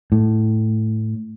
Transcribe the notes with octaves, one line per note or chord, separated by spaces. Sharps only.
A2